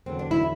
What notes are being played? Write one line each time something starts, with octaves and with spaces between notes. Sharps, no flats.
E2 D3 F#3 C4
D4
E4